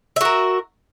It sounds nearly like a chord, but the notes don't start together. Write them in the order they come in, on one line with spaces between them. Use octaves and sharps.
E5 F#4 A#4